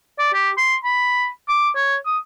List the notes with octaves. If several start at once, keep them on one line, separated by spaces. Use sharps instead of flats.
D5
G4
C6
B5
D6
C#5
D#6